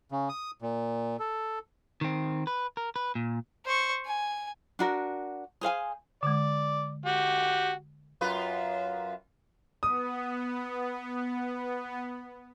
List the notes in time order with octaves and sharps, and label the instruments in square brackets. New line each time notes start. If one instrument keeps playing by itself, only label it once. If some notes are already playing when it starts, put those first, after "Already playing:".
[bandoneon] C#3
D#6
A#2
A4
[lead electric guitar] D#3 C4
B4
A#4
B4
A#2
[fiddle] C5 C#6
G#5
[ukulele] D4 F#4 A#4
G#4 C5 F5 G#5
[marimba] D3 G#3 [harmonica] D5
[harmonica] F#4 G4
[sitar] F#2 F4 B4
[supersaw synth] B3 [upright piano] D#6